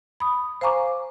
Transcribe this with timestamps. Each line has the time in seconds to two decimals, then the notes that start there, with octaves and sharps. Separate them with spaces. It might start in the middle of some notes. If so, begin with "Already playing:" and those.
0.20 B5 D#6
0.61 C5 F5 G#5 A#5 C#6 D6